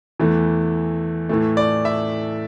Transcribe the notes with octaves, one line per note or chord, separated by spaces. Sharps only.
E2 E3 A3
A2 E3 A3
D5
E5